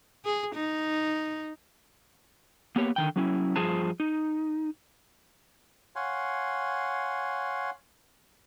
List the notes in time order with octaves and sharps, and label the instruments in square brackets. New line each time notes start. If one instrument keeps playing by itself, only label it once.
[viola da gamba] G#4
D#4
[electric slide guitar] A#3 B3 G4 C#5
D3 D#3 G5
F#3 C#4 E4
G2 F3 F4 G#4 C5 A5
D#4
[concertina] C#5 F5 F#5 G#5 C6